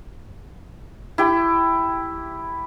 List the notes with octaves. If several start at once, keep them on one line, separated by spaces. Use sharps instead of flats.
E4 G4 G5